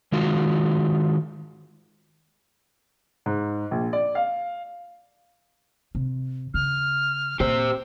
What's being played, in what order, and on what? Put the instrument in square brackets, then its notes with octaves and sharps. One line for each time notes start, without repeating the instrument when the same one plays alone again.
[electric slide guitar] D#3 G#3 F4 F#4
[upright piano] G#2
A#1
D5
F5
[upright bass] C3
[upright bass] C#3 [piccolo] F6
[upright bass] A#2 [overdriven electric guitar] G4 C5 [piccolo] E6